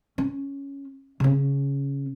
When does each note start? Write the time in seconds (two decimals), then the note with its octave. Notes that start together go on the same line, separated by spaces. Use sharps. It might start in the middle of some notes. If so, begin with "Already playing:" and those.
0.18 C#4
1.20 C#3 C#4